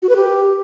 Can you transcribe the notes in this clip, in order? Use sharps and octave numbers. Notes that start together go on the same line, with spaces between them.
F#4
B4
G4